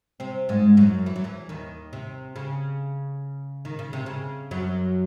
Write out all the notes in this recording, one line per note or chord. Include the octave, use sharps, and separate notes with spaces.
C3 C4
G#2 G#3
F#2 F#3
E3
F#3
E2 E3
D#2 D#3
C3
C#3
D#3
C#3
C3
C#3
F#2 F#3